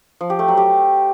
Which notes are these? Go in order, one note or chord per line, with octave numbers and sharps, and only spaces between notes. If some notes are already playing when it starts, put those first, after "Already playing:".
F3
G4
A3
F#3
G4